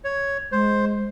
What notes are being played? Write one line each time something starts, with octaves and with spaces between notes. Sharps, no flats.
C#5
G#3 C5